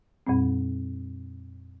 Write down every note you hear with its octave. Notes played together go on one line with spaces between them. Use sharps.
F2 A#2 G3 C4